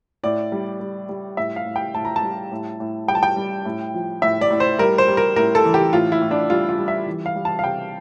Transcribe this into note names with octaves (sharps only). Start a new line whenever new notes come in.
A2 D5
G3
G3
G3
A2 E5
F5
A2
G5
A2 A5
A#5
A5
G3
A2
A2
G3 G5
A5
G5
G3
A2
F3
A2 E5
D5
A2
C5
G3 A#4
C5
G3
A#4
A2 A#4
A4
E3
G4
A2 F4
E4
A2
D4
G3 F4
F4
G3
E5
E3
F5
G3
A5
F5
C3 G5